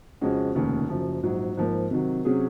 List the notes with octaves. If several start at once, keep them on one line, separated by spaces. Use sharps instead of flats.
F2 C#3 G#3 C#4 F#4
F1 D#2 C#3
F#1 F#2 F3
A#1 G#2 F#3
G#2 F3 A#3
C3 D#3 F#3
C3 F#3 C#4 G#4